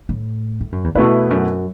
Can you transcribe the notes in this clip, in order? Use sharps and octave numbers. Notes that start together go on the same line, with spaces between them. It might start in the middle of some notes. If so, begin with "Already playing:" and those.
A2
A2
F#2
E2
E2 B2 A3 E4 B4
F#2